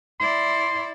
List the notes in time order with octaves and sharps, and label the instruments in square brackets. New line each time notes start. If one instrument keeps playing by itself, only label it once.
[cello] E4 D5 [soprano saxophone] C6